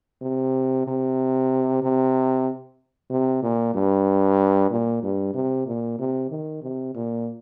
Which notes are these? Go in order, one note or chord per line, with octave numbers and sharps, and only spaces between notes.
C3
C3
C3
C3
A#2
G2
A#2
G2
C3
A#2
C3
D#3
C3
A#2